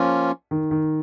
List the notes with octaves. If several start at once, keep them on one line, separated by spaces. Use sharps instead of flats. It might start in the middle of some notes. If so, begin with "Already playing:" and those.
Already playing: F3 A#3 C#4 F4
D#3
D#3